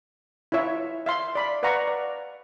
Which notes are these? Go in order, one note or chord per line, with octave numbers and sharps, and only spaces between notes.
E4 F4 C#5 E5
E5 F5 C6
D5 B5
B4 D5 F5 F#5 A#5 C#6
D5